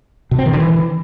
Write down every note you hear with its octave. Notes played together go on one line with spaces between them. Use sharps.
B2
C4
D#3
D3
E3